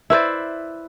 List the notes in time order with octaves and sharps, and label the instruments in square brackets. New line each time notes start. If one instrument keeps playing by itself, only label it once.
[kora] E4 B4 C5 D5